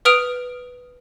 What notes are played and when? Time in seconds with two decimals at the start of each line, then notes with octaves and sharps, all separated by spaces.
0.05 B4 D#6 F6 D7 F7